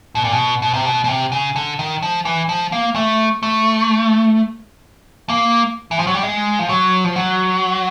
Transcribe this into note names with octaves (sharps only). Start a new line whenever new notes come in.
B2
A#2
B2
B2
C3
B2
B2
C3
C#3
D3
D#3
F3
E3
F3
A#3
A3
A3
A#3
E3
F3
F#3
G3
G#3
F3
F#3
F3
F#3